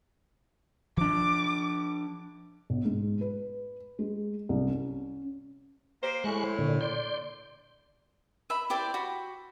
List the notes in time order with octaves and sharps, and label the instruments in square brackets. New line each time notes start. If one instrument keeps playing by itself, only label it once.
[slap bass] F3 D4 [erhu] D6
[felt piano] B1
G#2
B4
G#3
C2
C#4
[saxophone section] A#3 G4 C5
[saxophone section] A2 [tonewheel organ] G#3 C#6 F#6
[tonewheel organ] C5
A#2 D3
D5 C6 G6
[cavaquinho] E5 B5
E4 G4 C5 D5
F#4 B5